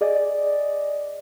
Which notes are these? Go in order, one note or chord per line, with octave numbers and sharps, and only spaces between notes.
G#4 D5 D#5